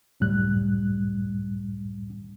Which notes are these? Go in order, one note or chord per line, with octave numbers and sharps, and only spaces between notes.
C#2 F#2 A2 G3 F#6